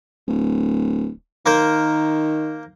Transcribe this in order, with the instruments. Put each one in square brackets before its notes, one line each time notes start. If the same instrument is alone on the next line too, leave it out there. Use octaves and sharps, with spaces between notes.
[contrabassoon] D1
[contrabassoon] D#3 [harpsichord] A#3 A#4 C5